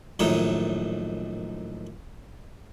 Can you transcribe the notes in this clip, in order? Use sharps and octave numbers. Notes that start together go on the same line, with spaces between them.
A#1 F#2 A2 D#3 D#4 C#5